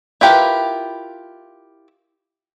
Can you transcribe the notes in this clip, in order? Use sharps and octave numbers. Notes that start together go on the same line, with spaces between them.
E4 F4 G4 A#4 B4